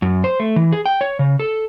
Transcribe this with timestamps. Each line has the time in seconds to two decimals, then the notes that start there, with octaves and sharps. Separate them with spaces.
0.02 F#2
0.24 C5
0.40 A3
0.56 E3
0.72 G#4
0.86 G5
1.01 C#5
1.19 C#3
1.40 A4